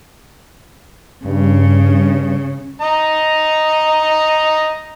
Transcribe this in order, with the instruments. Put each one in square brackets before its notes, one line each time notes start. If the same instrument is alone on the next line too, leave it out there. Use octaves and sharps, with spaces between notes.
[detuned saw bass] G2 [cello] C#3
[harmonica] D#5 A#5